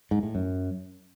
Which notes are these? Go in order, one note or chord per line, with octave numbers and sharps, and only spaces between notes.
G#2
A2
F#2